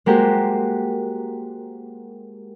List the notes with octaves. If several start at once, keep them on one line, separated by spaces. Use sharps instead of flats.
G#3 A#3 F#4 G4 A#4 C5